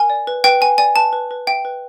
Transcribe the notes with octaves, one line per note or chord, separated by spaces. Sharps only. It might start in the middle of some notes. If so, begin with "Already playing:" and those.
Already playing: A#4 G#5
D5
B4
B4 G5
B4 G#5
D5 G#5
B4 A5
B4
B4
E5 G5
B4